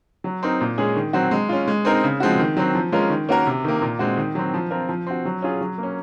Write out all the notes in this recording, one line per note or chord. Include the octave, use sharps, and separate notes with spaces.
F#3
C4 D#4 A#4
A#2
G#3 C#4 G#4
D#3
F#3 C4 F#4
G#3
C#4 F4
G#3
C4 D#4 A#4
C#3
F3 G#3 C4 F#4
D#3
F#3 C4
F3
G#3 C#4 F4 A#4
D#3
A#3 C#4 F#4 A#4
C3
D#3 A#3
A#2
G#3 C4 F#4
D#3
F#3 C4
F3
C4 F4 A#4
F3
C4 F#4
F#3
C#4 F4 G#4
F#3
A#3
C#4